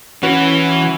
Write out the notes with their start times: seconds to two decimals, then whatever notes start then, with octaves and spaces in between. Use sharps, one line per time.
0.23 E3 C#4 F#4 B4